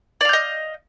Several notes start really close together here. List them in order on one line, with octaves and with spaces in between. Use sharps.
D5 F5 G6 D#5